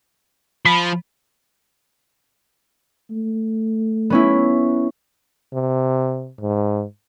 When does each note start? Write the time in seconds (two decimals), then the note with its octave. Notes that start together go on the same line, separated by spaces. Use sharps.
0.65 F3 B5
3.11 A3
4.10 B3 C#4 E4
5.53 C3
6.40 G#2